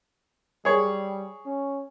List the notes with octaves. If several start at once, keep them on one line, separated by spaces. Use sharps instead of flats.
G3 G#4 C#5
C#4